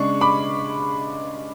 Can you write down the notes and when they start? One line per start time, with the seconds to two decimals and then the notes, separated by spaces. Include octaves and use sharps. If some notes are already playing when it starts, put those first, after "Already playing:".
Already playing: C#3 G#3 D4 C#6
0.21 B5 D6